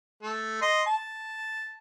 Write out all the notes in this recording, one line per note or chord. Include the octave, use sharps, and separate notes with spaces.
A3
D#5 C6
A5